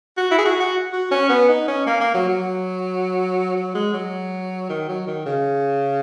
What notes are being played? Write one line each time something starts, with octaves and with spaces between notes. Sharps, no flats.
F#4
E4
G#4
F#4
F#4
F#4
C#4
B3
D#4
C#4
A#3
A#3
F#3
F#3
F#3
G#3
F#3
D#3
F#3
D#3
C#3